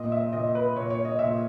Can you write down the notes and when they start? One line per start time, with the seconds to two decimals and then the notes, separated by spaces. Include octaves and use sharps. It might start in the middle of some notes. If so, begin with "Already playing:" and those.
Already playing: A#2 D#5
0.12 E5
0.33 A#2 D#5
0.55 B4
0.76 A#2 C#5
0.90 C#5
1.05 D#5
1.19 A#2 E5